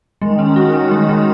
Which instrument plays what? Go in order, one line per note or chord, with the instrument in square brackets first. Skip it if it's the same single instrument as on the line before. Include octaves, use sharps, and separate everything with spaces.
[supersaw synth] D#3 [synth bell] G#3
[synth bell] C#4
F#4
[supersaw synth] D#3 [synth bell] C#4
[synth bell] G#3
G#3